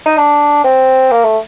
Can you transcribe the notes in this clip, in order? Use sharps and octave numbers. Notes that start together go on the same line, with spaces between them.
D#4
D4
C4
A#3
A3